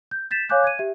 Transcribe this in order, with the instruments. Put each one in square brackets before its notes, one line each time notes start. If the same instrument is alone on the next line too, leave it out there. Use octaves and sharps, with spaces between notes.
[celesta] G6
G6 A6 B6 E7
C#5 F5 G#5 D6 F#6 G6
G#6 D#7
G4 E5